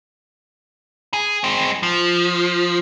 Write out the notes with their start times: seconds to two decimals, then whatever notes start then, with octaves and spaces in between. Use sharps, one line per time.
1.14 G#4
1.44 G#3 C4
1.83 F3